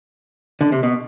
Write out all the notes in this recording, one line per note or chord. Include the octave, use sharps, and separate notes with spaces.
D3
C3
B2